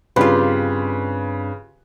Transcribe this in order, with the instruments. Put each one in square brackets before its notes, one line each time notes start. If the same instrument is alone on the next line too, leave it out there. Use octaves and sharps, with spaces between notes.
[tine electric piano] G2 C4 D4 [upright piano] C#3 B4 [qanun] F4 G4